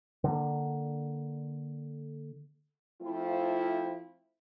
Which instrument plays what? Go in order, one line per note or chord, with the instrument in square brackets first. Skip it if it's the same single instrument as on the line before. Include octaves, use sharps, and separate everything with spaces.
[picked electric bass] D3 A#3
[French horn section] F3 A3 C4 E4 F4